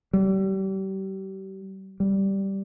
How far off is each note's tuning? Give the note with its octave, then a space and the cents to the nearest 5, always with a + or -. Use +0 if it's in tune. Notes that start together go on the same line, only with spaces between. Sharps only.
G3 -35
G3 -5